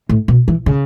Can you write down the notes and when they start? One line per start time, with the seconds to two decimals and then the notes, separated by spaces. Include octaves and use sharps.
0.09 A2
0.28 B2
0.48 E3
0.66 C#3